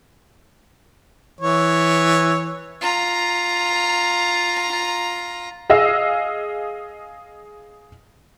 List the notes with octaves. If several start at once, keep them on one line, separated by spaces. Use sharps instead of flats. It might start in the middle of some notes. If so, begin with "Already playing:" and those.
E3 C#5
F4 A#5
G#4 D#5 F5 E6